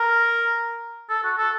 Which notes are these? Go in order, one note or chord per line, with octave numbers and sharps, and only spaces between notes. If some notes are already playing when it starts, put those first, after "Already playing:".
Already playing: A#4
A4
F#4
A4